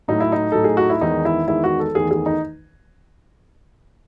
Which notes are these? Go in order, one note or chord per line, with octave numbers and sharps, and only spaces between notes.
A2 F#3 A3 D#4
E4
D#4
A2 F#3 A3 A4
G#4
F#4
E4
E2 D#3 G#3 D#4
E4
E2 D#3 G#3 E4
F#4
A4
E2 D#3 A3 G#4
G#4
D#4